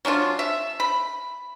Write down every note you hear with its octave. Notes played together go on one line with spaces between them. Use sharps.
F#3 C#4 D4 F4
E5
B5